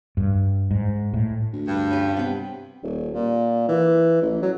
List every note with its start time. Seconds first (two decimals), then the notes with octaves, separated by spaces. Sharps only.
0.17 G2
0.71 G#2
1.13 A2
1.53 D2
1.68 G2
1.91 C#4 F4 G4
2.17 C3 B3 G5
2.83 D#1
3.14 A#2
3.69 E3
4.22 A1
4.42 F#3